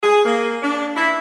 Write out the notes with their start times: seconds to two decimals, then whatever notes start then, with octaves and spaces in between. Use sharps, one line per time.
0.03 G#4
0.25 A#3
0.63 D4
0.97 E4